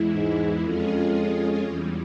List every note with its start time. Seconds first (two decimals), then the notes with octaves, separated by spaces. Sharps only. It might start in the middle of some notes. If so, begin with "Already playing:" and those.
Already playing: E2 E3 G#3 E4
0.14 G#2
0.64 F2 G#3 C#4 F4 G#4
1.64 E2 E3 G3